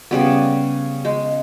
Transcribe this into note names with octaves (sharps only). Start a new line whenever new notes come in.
C#3 G3 B3
G#3